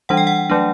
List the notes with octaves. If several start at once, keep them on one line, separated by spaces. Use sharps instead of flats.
E3 G3 D4 F#5
G5
F#5
F#3 A3 D4